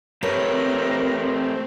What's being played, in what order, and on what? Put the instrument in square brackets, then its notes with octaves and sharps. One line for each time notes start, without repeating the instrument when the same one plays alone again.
[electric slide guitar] A3 G4 B4 [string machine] C4 [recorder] A#4 [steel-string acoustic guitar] C#5